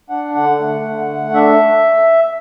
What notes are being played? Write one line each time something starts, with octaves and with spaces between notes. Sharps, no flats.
D4 F#5
D3 F#5
A3
D3
A3
D4 E5